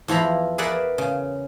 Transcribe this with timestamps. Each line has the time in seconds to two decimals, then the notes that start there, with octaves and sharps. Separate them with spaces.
0.08 E2 F3 E4 A#5 B5
0.58 G#4 A#4 B4 D5 E5 F#5
0.98 C#3